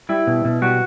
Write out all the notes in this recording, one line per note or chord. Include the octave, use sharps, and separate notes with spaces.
G3 E4
B2
B2
G3 F#4